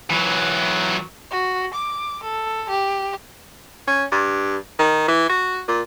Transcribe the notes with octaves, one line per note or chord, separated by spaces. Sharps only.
E3 F#3
F#4
D6
A4
G4
C#4
G2
D#3
E3
F#4
A#2